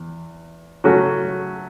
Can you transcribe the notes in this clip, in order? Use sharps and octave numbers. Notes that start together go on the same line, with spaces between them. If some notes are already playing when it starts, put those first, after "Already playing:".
Already playing: E2
C#3 F#3 A3 C#4 F#4